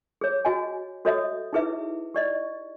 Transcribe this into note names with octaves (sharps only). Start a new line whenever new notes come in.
G#4 C#5
F#4 D#5 G#5
F#4 A4 C#5 D#5 E5 D#6
D#4 E4 G#4 B4 E5
G4 D5 D#5